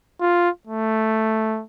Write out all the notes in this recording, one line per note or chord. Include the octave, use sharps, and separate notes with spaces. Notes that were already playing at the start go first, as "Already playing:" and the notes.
F4
A3